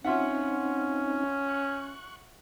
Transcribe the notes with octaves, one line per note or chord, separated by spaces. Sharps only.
C4 C#4 D#4 F4 E5 F#5
C#6 F#6